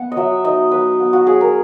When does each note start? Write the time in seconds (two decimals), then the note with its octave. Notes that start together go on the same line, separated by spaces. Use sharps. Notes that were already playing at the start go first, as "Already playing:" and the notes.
Already playing: B3 F#5
0.12 D#5
0.17 F#3 E5
0.44 D#4 D#5
0.71 F#3 B4
1.00 B3
1.13 F#4
1.27 F#3 G#4
1.41 A#4